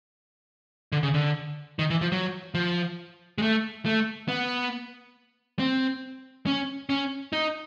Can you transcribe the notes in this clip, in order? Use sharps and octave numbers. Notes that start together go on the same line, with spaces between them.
D3
C#3
D3
D#3
E3
F3
F#3
F3
G#3
A3
A3
B3
C4
C#4
C#4
D#4